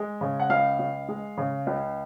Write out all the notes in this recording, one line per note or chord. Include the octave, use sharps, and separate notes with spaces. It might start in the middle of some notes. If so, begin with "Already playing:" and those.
Already playing: G#3
C#3
F#5
C#2 F5
C#2
G#3
C#3
C#2